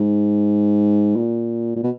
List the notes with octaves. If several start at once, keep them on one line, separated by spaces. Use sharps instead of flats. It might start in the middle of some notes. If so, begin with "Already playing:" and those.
Already playing: G#2
A#2
A#2
B2